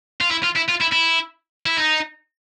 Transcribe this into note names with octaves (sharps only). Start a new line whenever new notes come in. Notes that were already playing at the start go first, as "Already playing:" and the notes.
F4
E4
F4
E4
F4
E4
E4
E4
D#4